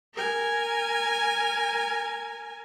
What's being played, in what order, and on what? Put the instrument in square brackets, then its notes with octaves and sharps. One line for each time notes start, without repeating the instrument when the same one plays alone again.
[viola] A#4 G#5